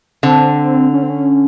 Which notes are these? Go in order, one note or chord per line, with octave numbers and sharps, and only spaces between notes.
D3 C4
C#4
C4
C#4